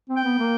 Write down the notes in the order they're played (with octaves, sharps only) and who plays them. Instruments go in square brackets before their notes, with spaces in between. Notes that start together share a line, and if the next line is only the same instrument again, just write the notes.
[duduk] C4
[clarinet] G5
[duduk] B3
A#3